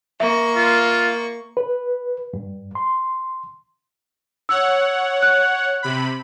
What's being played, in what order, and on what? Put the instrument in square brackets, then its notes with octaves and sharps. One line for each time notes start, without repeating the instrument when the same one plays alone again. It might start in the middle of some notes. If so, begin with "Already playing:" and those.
[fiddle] A#3 C#6 [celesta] E5
[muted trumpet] F4
[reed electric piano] B4
G2
C6
[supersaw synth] C#5 F#5 [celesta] E6
[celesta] F#6
[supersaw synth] C3 B5